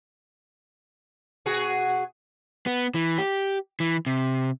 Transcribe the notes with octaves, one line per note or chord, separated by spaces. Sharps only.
B2 F#4 G#4
B3
E3
G4
E3
C3